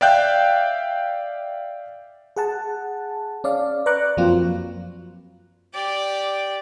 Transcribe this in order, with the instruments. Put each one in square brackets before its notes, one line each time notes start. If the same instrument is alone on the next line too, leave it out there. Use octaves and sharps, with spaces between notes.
[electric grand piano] D5 E5 F5 G5 F#6 G6
[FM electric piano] G#4 F#5 A5
C#4 D5 F5
B4 D5 A#5 C#6 D6 F#6
F#2 F3 F#3 A#3 C4 F4
[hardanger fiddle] G4 D5